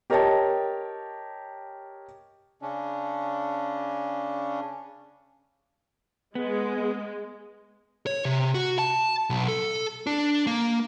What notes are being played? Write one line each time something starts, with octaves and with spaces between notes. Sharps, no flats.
G4 A#4 C#5 D#5 G5 A5
C#3 C#4 D4
G#3 B3
C#5
C3
F#4
A5
B1
A4
D4
A#3